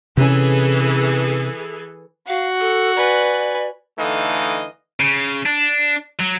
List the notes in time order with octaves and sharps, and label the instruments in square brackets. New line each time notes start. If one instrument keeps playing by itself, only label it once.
[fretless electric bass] C3 C#4 [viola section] E3 G#4 A4
[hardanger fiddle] F#4 [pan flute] F5
[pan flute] A4
[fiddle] B4 G#5 [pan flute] D5
[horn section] D3 E3 A3 D#4 D#5 F5
[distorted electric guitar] C#3
D4
F#3